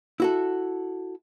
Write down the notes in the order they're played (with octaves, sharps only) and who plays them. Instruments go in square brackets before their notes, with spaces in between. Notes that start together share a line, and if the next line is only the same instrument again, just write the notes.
[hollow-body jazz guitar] E4 F#4 A4